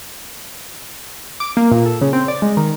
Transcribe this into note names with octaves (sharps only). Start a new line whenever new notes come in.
D6
A#3
A#2
A4
C#3
C4
D5
G#3
D#3